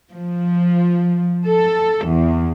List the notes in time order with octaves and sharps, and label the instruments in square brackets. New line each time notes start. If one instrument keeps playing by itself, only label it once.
[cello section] F3
A4
E2